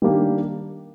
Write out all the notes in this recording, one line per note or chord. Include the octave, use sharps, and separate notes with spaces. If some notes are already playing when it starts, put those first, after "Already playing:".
D#3 G3 A#3 D4 G4